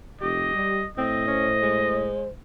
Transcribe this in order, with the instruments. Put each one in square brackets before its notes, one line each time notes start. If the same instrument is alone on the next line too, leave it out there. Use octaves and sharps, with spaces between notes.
[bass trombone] F1 [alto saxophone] G4 [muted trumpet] D#5
[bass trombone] G3
[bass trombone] A2 [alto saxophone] C4 [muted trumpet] D#5
[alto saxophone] C#4 [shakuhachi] C5
[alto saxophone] G#3